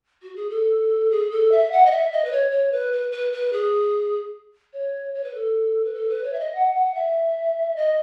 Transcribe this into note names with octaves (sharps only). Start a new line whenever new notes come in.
F#4
G#4
A4
G#4
A4
E5
F#5
D#5
E5
D#5
B4
C#5
C#5
B4
B4
B4
B4
G#4
C#5
C#5
B4
A4
B4
A4
B4
C#5
E5
D#5
F#5
F#5
E5
D#5